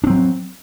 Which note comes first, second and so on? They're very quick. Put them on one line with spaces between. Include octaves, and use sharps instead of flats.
D4 C4 F#3